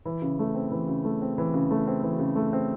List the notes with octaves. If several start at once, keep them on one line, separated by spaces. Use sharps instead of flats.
E3
C#3
A3
C4
E3
C#3
A3
C4
E3
C#3
A3
C4
E3
C#3
A3
C4